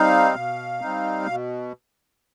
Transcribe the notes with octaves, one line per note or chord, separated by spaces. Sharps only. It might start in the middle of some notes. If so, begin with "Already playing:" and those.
Already playing: G3 C4 D#4 F5
B2
G3 C4 D#4
B2